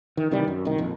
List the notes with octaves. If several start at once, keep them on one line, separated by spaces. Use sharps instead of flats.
D#3
C3 D#3 E3 G3
F#2
C2 D#3
A#1 F2